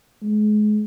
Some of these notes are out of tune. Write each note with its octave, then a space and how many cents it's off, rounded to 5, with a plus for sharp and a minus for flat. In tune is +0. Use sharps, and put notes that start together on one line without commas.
G#3 +30